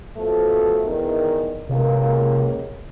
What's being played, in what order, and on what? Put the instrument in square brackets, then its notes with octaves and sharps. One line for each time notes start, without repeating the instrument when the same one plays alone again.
[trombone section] B2 F3 A3
E2 D#3
[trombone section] C#2 A#3 [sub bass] C3